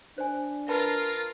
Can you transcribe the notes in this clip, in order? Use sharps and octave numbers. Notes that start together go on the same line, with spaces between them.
D4 C5 G#5
F4 A#4 B4 A5 B5